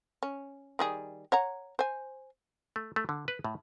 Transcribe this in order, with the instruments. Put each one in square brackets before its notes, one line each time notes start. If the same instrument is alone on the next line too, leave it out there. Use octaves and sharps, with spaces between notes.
[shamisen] C#4
D#3 G3 G#4
C#5 F#5 A#5
C5 G#5
[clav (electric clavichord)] A3
A3
D3
B4
A2